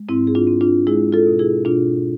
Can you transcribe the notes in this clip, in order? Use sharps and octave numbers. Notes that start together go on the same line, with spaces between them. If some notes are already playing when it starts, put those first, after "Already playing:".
Already playing: G#3
G#2 C4 E4
G#4
D4 F4
C4
D4 F4
G#3 E4 G#4
F4 A4
B2
E4 G#4
B2 D4 F4